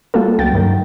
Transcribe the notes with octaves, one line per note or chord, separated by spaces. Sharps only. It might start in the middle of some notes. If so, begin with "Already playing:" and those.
G3 A3 A#3 F4 F#4 A4
C#2 F#3 A3 G5 A6
G2 D#3 F#3